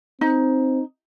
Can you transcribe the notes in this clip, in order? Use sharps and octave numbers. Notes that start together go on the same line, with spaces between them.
C4 D#4